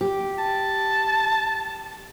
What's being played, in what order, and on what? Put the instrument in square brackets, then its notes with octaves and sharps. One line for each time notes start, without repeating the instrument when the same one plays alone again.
[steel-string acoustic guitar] G4
[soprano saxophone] A5